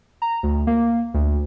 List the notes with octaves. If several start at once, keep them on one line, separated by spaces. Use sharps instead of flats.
A#5
D2
A#3
D2